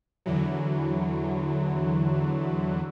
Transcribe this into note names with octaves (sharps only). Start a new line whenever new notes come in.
E2 D3 E3 F#3